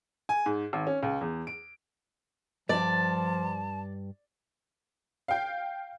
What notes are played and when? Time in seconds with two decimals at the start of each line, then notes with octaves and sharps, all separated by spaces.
0.29 G#5
0.46 G#2
0.73 G#1
0.87 C#4
1.03 C#2
1.21 E2
1.47 D7
2.69 G2 F3 D5 A5
5.28 F5 G5